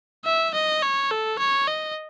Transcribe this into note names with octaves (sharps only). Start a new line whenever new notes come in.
E5
D#5
C#5
A4
C#5
D#5